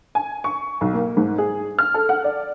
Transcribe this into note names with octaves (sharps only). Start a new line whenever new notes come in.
G#5
C#6
B1
A#3
G#2
G#4
F6
A4
F#5
D5